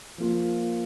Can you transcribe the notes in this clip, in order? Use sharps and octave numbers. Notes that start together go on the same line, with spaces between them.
F3 A#3 F4